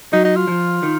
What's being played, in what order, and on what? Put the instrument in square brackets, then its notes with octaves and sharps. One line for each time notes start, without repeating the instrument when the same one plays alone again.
[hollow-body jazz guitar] F#3 [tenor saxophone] D#4
[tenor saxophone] D#4
F4
[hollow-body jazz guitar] F3
D#3